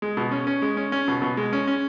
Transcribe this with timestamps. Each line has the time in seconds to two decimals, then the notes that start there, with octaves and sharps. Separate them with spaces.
0.02 G#3
0.17 B2
0.31 C#4
0.47 C#4
0.62 G#3
0.77 C#4
0.92 C#4
1.08 B2
1.22 B2
1.37 G#3
1.53 C#4
1.67 C#4